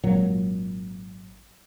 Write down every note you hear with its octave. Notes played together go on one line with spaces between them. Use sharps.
G#1 A#2 F#3